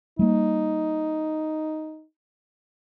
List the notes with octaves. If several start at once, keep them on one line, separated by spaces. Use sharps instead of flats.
G3 A#3 D#4